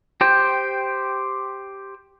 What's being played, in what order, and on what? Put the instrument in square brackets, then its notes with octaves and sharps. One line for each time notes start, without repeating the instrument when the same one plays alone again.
[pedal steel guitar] G4 C5 G5